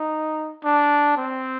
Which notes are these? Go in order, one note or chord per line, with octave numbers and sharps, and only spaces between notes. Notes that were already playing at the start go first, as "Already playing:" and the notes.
Already playing: D#4
D4
C4